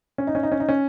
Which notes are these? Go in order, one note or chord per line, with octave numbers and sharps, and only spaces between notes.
C#4
D#4
C#4
D#4
C#4
D#4
C#4